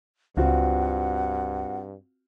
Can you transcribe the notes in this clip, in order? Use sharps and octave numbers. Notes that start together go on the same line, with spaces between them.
C#2 G2 C4 F4 F#4 F#5